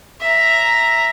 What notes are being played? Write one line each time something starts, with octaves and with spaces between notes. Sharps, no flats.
E5 A#5